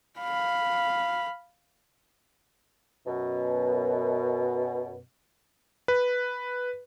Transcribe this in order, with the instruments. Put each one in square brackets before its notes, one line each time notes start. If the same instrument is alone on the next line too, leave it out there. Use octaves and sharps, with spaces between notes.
[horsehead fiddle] F5 B5
[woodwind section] F#2 B2
[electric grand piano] B4